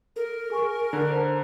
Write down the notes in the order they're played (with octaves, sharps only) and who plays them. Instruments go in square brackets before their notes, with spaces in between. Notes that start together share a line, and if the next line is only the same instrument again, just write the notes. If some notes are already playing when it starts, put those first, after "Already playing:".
[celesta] A4 [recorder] A#4
[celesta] G#4 G#5 C#6
[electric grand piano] D3 [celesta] F#5 A#5 F#6
[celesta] C5 A5 A#5